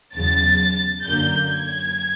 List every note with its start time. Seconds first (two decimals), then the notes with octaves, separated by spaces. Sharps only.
0.16 E2 C#3 F#3 A6
1.05 F#2 D3 F#3 A#3 G6
1.49 G#6